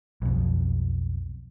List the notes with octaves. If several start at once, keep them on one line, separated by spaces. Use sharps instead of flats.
B1 F2